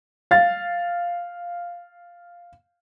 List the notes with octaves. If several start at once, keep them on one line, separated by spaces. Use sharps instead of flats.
F5 A6